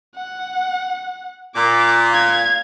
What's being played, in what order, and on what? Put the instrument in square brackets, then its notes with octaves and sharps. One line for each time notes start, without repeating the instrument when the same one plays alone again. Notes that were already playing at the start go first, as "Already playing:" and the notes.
[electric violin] F#5
[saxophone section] A#2 [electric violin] D6
[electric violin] F5 G#6